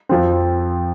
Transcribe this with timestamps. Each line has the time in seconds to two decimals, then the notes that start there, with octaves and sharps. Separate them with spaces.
0.09 F2 F3 C4